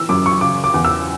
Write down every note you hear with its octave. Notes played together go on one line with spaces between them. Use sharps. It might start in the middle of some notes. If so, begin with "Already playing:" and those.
Already playing: E3 E6
F#2 D6
C#6
C#3 D6
D6
E2
E6